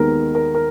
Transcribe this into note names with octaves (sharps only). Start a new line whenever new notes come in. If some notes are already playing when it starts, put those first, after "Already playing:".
Already playing: D#2 D#3 G#3 B3 D#4 A#4
A#4
A#4